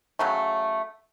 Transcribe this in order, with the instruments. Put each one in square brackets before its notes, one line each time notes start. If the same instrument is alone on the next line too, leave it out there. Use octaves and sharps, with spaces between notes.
[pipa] C#3 F#3 A3